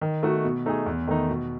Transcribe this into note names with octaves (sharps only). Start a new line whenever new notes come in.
D#3
A3 D#4 F#4
B2
A3 D#4 G#4
E2
D#3 A3 D#4
B2